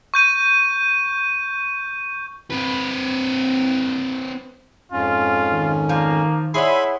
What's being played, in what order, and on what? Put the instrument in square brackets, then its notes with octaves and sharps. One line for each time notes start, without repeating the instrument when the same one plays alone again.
[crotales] C#6 G6 D#7
[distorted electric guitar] C4 B4
[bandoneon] F2 G#2 C#4 [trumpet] F4
[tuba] D#3
[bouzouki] F3 [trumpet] A#3
[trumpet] E4 [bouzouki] G#4 C#5 F#5 [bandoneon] E5 B5 C6